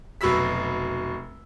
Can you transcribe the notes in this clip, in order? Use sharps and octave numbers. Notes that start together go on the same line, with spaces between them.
F1 B2 F#3 B5 E6 B6